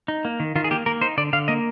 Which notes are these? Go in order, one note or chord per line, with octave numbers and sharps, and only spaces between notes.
D#4
A#3
D#3
D#3 F4
G#4
A#3 G4
A#3 A#4
D#4 C5
D3 D5
D3 F5
A#3 D#5